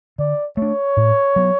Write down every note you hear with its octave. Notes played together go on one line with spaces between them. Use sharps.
D3 D5
A3 D4 C#5
A2
F#3 B3